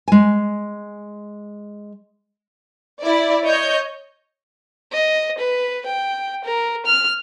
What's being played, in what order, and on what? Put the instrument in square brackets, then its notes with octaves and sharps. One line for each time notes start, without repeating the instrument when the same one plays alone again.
[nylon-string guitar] G#3 G#5
[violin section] E4 D5
C#5 D#5 G6
[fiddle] D#5
B4
G5
A#4
F6